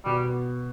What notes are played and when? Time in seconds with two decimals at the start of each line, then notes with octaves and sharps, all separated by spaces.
0.05 B2 G3
0.25 B3